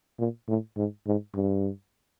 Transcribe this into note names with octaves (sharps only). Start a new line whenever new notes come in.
A#2
A2
G#2
G#2
G2